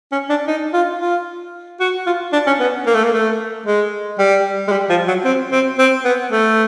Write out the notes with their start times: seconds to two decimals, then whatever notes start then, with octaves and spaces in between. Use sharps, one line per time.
0.12 C#4
0.30 D4
0.48 D#4
0.73 F4
1.00 F4
1.80 F#4
2.06 F4
2.33 D4
2.47 C#4
2.59 B3
2.86 A#3
2.95 A3
3.04 A#3
3.13 A3
3.66 G#3
4.19 G3
4.68 G#3
4.72 G3
4.90 F3
5.08 F#3
5.25 C4
5.52 C4
5.79 C4
6.05 B3
6.32 A3